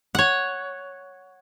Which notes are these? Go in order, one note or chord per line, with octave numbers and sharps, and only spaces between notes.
C#5 F#5